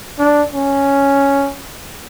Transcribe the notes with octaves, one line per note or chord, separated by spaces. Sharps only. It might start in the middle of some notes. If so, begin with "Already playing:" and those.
D4
C#4